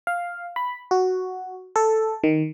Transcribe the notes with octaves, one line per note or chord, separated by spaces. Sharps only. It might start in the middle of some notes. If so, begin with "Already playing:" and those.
F5
B5
F#4
A4
D#3